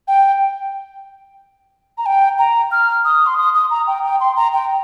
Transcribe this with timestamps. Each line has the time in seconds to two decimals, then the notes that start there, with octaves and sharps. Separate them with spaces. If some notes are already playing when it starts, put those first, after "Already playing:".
0.08 G5
1.98 A#5
2.06 G5
2.39 A#5
2.72 F6
3.05 D#6
3.26 C6
3.38 D#6
3.55 D#6
3.71 A#5
3.87 G5
4.04 G5
4.20 C6
4.36 A#5
4.53 G5